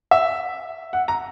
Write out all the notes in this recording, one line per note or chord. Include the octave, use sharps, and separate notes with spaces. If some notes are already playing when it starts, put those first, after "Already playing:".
E5
F#5
A#5